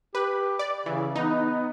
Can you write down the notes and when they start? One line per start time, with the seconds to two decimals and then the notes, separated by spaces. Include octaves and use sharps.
0.15 G4 B4
0.59 D5
0.86 C#3 E3
1.16 B3 D#4